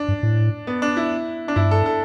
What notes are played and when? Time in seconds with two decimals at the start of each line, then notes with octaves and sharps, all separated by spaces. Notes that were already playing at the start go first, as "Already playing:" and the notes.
Already playing: D4
0.08 G2
0.23 A2
0.67 B3
0.82 D4
0.97 E4
1.48 D4
1.56 G2 E4
1.71 A4
1.86 A4